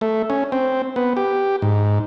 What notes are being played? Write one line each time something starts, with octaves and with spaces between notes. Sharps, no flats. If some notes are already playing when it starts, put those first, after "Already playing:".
A3
C#4
C4
B3
G4
G#2